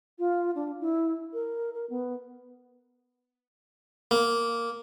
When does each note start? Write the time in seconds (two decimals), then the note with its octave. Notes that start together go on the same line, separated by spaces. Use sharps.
0.19 F4
0.55 D4
0.81 E4
1.33 A#4
1.74 A#4
1.90 B3
4.11 A#3